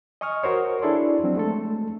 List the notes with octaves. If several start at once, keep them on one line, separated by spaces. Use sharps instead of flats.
D#5 G#5 C#6 D#6 F6
F#4 A#4 C5 C#5
D4 E4 G#4 A4 D5 C6
F3 F#3 C4 D4
G#3 A3 A4